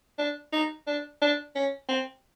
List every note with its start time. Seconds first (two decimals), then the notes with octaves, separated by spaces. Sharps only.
0.19 D4
0.53 D#4
0.87 D4
1.22 D4
1.56 C#4
1.89 C4